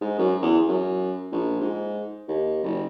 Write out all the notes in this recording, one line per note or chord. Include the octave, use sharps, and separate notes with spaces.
G#2
F#2
E2
F#2
A#1
G#2
D#2
F#1